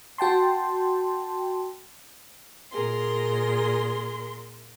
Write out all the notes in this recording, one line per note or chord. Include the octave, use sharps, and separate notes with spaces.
F#4 G5 A5 C6
A#2 G#4 A#4 C6